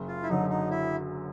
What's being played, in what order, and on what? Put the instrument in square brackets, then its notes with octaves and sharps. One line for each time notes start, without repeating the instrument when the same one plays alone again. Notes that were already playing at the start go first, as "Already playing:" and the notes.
Already playing: [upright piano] F#1
[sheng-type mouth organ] F4
E4
[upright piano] F#2 D3 F#3 [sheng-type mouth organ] D#4
[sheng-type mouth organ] D#4
E4